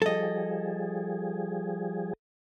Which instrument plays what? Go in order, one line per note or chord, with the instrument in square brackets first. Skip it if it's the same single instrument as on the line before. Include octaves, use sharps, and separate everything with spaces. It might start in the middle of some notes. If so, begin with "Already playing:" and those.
[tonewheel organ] F3 G3 G#4 [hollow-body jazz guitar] A4 D#5